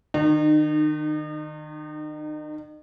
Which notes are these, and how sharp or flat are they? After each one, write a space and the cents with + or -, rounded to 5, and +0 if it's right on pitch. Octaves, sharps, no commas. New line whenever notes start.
D#3 -20 D#4 -40